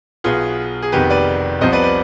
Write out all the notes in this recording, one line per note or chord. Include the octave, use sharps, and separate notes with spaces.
B1 B2 B3 F4 G#4
G#4
F1 F2 D#3 B3 G4 B4
B4 D5
C2 C3 F3 B3 C5 D#5
B4 D5
B4 D5